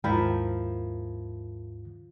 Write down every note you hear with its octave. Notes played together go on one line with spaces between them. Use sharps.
D#2 G#2 F3 E4 A#4 G5